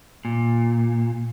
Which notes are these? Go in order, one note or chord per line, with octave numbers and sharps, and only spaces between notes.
A#2